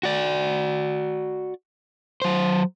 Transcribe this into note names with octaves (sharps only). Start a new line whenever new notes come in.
F#4 D5
F#3 C5